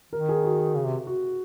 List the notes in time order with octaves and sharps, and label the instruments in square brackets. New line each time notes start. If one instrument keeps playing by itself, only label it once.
[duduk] D#3 [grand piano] A#4
[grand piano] G#4
F#4
[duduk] C#3
C3
[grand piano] F#4